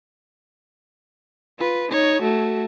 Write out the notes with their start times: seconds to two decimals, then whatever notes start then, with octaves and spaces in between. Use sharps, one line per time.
1.58 F4 B4
1.91 D#4 C#5
2.22 A3 F#4